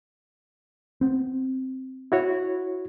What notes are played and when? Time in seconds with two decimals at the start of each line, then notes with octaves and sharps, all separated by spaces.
1.01 B3 C4
2.12 E4 F#4 C#5